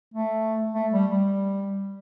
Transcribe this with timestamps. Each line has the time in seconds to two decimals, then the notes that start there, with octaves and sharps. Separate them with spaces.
0.14 A3
0.73 A3
0.92 G3
1.11 G3